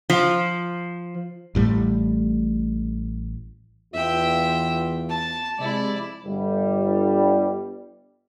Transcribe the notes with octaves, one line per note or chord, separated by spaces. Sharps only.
F3
A1 A2 G3
E2 F4 E5 G5
A5
C3 F3 G#3 E4 D5
G1 G3